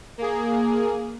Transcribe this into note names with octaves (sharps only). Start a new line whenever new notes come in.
A#3 G#4